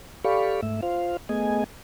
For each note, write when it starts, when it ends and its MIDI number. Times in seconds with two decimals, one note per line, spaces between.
0.25 0.61 67
0.25 0.61 69
0.25 0.61 74
0.25 0.61 77
0.25 0.61 83
0.25 0.61 85
0.63 0.81 44
0.63 0.81 57
0.63 0.81 76
0.83 1.17 65
0.83 1.17 72
0.83 1.17 77
1.29 1.64 57
1.29 1.64 59
1.29 1.64 68
1.29 1.64 75
1.29 1.64 80